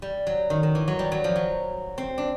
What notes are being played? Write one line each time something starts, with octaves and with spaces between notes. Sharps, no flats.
G3
F#3
D#3
D#3
E3
F#3
G3
F#3
F3
F#3
C4
D4